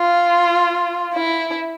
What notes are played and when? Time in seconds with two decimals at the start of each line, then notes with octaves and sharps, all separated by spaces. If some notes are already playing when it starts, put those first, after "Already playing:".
Already playing: F4
1.14 E4